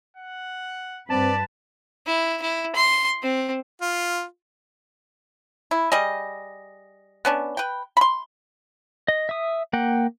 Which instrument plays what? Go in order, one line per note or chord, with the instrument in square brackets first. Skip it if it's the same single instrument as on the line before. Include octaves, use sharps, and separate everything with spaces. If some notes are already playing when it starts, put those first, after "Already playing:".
[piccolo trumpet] F#5
[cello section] G2 B4 [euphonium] C4 [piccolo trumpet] D5 [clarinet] A5
[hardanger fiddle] E4
E4
C6
C4
[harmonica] F4
[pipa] E4
G3 G#4 D#5
B3 C#4 D4
B4 G5
B5 C6
[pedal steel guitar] D#5
E5 D#6
A#3 F#5 G5